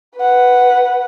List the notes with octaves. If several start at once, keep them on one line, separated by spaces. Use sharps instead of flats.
B4 F#5